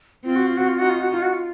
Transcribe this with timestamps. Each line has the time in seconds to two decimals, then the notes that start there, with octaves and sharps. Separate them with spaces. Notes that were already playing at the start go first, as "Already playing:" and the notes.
0.25 C4 F4
0.36 F#4
0.47 F4
0.57 F#4
0.68 F4
0.78 D#4 F#4
0.90 F4
1.00 F#4
1.12 F4
1.22 F#4
1.33 F4